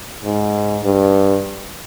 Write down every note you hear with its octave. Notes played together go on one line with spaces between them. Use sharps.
G#2
G2